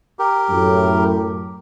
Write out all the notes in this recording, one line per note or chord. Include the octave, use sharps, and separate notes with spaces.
G4 A#4
F#2 A2